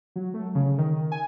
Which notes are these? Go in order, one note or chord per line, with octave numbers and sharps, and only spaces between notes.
F#3
A3
C#3
D#3
G#5